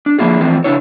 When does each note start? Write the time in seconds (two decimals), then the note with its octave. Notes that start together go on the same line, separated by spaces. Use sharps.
0.06 D4
0.19 D3 F3 A#3 E4 F4 G#4
0.40 E3 F3 A3 C4
0.64 C#3 D4 E4 C#5